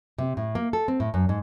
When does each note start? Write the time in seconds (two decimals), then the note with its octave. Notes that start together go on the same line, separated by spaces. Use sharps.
0.18 C3
0.37 A2
0.55 A#3
0.73 A4
0.88 C4
1.00 A2
1.14 F#2
1.29 G#2